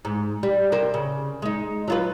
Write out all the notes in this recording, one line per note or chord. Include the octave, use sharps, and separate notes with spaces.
G#2
G3
C3 A#4 C5
C#3
G#3 D#4
F#3 F4 B4